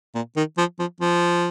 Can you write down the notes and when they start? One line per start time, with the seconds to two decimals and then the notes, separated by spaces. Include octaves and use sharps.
0.15 A#2
0.37 D#3
0.58 F3
0.79 F3
1.01 F3